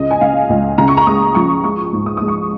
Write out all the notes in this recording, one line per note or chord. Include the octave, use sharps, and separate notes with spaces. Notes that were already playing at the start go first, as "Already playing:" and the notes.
Already playing: C#2 C#3 D#5
G#5
C#3 F5
C#2
C#3 A#5
C#6
A#5
G#3 D#6
F3 C#6
G#3 C#6
G#2
D#6
G#3 D#6
C#6